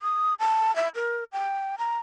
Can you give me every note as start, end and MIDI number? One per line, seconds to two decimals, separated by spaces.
0.02 0.34 87
0.39 0.74 81
0.76 0.88 76
0.95 1.24 70
1.32 1.76 79
1.78 1.98 82